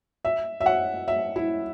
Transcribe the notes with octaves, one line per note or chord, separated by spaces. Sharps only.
E5
E5
F#5
E5
E4